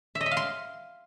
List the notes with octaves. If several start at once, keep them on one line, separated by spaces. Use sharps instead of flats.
E5
D#5
E5
F5
C6